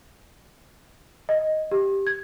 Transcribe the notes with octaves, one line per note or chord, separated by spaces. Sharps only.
D#5
G4
G#6